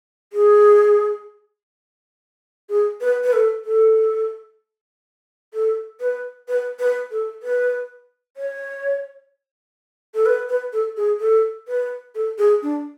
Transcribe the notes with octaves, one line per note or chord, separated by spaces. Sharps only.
G#4
G#4
B4
B4
A4
A4
A4
B4
B4
B4
A4
B4
C#5
A4
B4
B4
A4
G#4
A4
B4
A4
G#4
D4